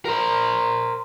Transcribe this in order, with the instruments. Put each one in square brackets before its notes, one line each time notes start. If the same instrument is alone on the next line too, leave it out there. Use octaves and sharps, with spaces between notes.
[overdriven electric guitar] A#4 C5